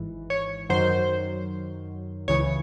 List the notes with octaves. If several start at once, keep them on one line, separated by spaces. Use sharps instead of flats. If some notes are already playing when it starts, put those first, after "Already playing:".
Already playing: G#1 G#2 E3
C#5
F#2 D#3 F#3 C5
C#2 C#3 E3 C#5